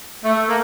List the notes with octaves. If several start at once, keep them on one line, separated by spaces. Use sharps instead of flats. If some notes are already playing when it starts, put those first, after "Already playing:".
A3
A#3